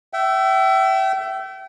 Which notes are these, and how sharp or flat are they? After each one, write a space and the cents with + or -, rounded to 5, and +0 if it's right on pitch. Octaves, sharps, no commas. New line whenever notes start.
E5 +15 G5 -35